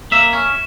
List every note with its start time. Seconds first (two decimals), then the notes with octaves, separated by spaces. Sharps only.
0.12 A#3 E5
0.33 C#4